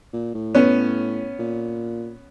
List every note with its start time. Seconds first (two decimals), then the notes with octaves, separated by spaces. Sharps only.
0.13 A#2
0.34 A2
0.55 B3 C#4
1.39 A#2